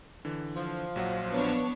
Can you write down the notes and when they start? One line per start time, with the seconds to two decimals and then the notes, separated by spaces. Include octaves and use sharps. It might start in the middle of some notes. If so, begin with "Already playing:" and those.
0.25 D3 E3
0.55 F3
0.96 A#1 F#3 F#5
1.31 B3 D4 C#5